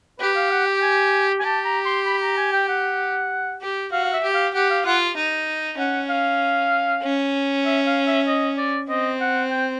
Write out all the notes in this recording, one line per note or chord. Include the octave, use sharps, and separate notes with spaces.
G4 B4
F5
F#5
G5
G#5
G#5
G4 A5
A#5
C6
B5
A#5
G#5
G5
F#5
G4
F#4 F5
F5
E5
G4
F5
G4 F#5
F5
F4 F#5
D#4
C#4 F#5
F5
C#4
E5
F5
E5
D#5
D5
C4 D#5
F#5
G5